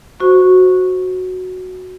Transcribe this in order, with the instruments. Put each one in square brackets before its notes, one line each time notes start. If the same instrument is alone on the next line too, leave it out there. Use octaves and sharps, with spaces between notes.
[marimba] F#4 C5 C#6